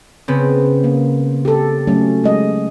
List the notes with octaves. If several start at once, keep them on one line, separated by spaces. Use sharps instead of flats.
C#3 B3 C4
A#3
G4 A4
F#3 A3 C#4
G#3 D#5